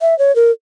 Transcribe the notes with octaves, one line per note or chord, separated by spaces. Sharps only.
E5
C#5
A#4